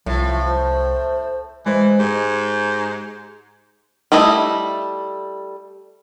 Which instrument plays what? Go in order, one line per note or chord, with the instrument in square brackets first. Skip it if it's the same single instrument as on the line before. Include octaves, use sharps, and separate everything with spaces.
[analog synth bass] C2 [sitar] A2 [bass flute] F3
[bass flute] C5
[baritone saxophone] E3 [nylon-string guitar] G#3 C5
[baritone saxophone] G#2 [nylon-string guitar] G4 G#5
[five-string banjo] G3 A3 E4 D#5